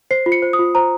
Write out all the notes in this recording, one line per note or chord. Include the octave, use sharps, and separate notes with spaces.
C5 C7
F4
C#7
C5
D#6
F4
C5 A#5